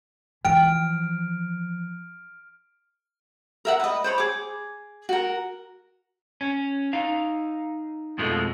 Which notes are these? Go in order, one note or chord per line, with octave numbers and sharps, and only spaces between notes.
E3 F3 G5 F6 D7
A#4 E5 F#5
B4 D#5
C5 C#5 B5
G#4 D6
F#4 A#4
C#4
D#4 F5
F2 B2 F3 G#3 A3